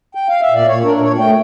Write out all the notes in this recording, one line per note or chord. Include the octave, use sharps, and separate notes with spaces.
G5
F5
E5
A#2 D5
A#2 C#5
D4 A#4
A#4
A#2 C#5
A3 G5